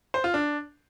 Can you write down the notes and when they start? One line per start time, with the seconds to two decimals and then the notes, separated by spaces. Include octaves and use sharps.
0.14 C5
0.24 F4
0.34 D4